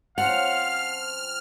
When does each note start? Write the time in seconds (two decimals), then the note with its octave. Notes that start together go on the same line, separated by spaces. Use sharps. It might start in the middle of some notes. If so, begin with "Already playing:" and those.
0.18 F3 C4 C#4 F5 F#5 F6